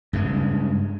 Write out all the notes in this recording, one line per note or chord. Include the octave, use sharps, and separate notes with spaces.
G2 C#3 G#3